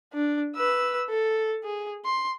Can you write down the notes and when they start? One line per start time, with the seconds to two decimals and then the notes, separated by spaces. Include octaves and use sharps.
0.13 D4
0.56 B4 E6
1.10 A4
1.64 G#4
2.05 C6